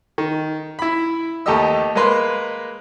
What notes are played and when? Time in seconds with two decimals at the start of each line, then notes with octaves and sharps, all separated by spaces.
0.18 D#3
0.79 E4 B5
1.46 D#2 A3 G4 A4 D#5 E6
1.95 G#3 A#3 A#4 B4 C6